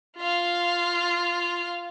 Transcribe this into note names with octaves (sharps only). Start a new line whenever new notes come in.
F4 F5